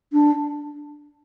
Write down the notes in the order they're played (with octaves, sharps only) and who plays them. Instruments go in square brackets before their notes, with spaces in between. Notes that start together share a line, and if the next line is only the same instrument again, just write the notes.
[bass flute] D4